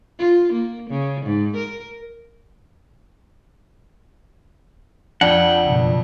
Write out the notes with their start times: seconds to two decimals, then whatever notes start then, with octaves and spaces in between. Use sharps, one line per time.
0.19 F4
0.53 A#3
0.90 C#3
1.26 G#2
1.56 A#4
5.21 F2 D4 D5 F#5 G5
5.66 F#1 F#2 B2